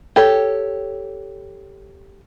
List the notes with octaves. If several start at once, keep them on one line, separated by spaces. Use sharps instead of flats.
G4 A4 C#5